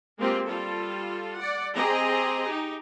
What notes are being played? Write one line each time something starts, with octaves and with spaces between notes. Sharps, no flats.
G#3 A#3 C4 F4 G4
G3 F4 A4
D5 F#5
C4 G4 G#4 D#5 A#5
D#4 G4